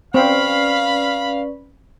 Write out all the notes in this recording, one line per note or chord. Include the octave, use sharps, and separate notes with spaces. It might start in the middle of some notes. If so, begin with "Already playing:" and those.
C4 C#4 B4 D5 F5 B5